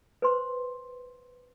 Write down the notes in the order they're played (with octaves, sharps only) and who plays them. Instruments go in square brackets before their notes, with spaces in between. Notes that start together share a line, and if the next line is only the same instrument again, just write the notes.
[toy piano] B4 C5 C6